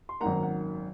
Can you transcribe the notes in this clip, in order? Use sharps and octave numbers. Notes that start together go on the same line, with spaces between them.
C6
G#1 F#2 D#3 A#3 F#5 A#5
F#5